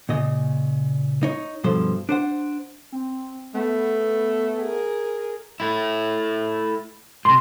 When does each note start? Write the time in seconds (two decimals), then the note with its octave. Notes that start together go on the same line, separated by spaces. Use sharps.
0.09 A#2 C#3 D#5
1.23 D#4 C#5
1.64 G2 B2 F3 A4 C5
2.09 D4 C5 F#5
2.92 C4
3.55 A3 B3
4.59 G#4 A#4
5.60 A3 E4
7.25 A2 C3 C6